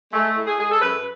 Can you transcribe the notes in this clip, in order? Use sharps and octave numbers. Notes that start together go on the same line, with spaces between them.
G#3 A3
A2
G#4
G#3 G#4
A4
F#2 B4